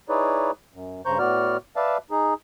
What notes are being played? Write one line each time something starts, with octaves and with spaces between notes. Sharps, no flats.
D#4 E4 G#4 B4 C#5 D5
F#2
G2 C#3 C5 A#5 C#6 G6
A2 B3 F#4 D5 F6
B4 D5 E5 F5 A5
D#4 G#4